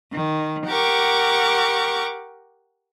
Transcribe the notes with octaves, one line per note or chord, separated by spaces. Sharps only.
D#3
G4 A#4 F#5 C#6 D6